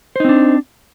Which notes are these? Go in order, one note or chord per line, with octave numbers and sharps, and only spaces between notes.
C4 D4 D#4 C5